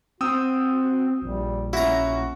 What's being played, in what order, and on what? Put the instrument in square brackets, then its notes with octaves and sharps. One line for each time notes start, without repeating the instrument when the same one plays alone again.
[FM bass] C4 [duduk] F#4 [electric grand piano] G5 D#6 E6
[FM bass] A#1 [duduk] G3
[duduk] C#4 [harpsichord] E4 A#5 [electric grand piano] F#4